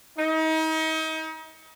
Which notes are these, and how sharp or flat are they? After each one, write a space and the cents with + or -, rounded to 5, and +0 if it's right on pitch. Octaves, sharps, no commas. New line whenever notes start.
D#4 +35